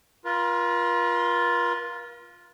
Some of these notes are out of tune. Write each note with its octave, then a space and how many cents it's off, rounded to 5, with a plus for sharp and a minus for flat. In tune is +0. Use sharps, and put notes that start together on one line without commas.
F4 +0 A#4 +45